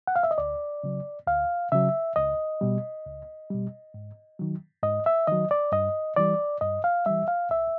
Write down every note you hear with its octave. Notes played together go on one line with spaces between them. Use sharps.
F#5
F5
E5
D#5
D2 D5
C#3 F#3
D2 F5
C#3 F#3 E5
C#2 D#5
B2 G3
C#2
B2 G3
G#2
D#3 F#3
G#2 D#5
E5
D#3 F#3 D#5
D5
G2 D#5
E3 G3 D5
G2 D#5
F5
E3 G3 E5
F5
C2 E5